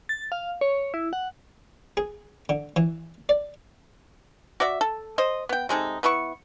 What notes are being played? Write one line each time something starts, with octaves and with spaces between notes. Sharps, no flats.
A6
F5
C#5
E4
F#5
G#4
D3
E3
D5
F#4 D5 E5
A4
C5 D#5
B3 G5
C3 G#3 D#4 A4
B3 E4 B4 C#6